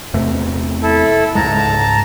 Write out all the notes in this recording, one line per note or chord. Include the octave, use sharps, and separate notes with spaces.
E2 C3 A3
E4 A4
C#2 G#2 G#3 A5 A#5